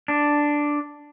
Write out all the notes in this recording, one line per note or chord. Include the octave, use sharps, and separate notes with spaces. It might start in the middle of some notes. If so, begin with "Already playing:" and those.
D4